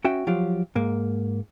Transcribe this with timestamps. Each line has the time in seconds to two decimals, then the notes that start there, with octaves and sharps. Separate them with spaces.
0.04 C#4 F#4 E5 G5
0.27 F3 F#3 F4 G4
0.75 G#2 A#3